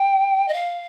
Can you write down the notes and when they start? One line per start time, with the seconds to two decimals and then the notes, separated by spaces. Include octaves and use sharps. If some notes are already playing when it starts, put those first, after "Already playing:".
Already playing: G5
0.48 D#5
0.54 F5